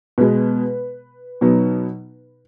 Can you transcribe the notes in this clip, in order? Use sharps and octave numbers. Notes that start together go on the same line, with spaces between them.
B2 G#3 B3 B4
B2 F#3 B3 D#4